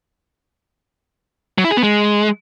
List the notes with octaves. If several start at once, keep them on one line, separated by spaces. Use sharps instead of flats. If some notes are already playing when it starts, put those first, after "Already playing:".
F#3
E4
G#4
B3
G#3